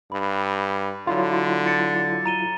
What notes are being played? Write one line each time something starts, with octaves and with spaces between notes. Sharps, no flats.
G2 B5
D3 F#3 E4 F4
A6 C#7
A#5 D#7 G7